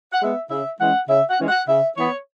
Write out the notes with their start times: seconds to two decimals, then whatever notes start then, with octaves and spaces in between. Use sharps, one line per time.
0.12 F#5
0.21 G#3 B3 E5
0.50 C#3 E5
0.79 E3 G#3 C#4 F#5
1.08 C#3 E5
1.29 F#5
1.38 E3 G#3 C#4
1.48 F#5
1.68 C#3 E5
1.97 E3 B3 C#5